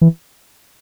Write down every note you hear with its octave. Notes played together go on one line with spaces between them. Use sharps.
E3